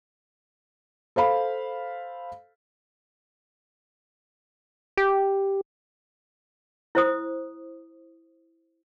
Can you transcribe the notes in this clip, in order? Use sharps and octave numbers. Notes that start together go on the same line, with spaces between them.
A4 C5 F5 B5
G4
E4 C5 D#6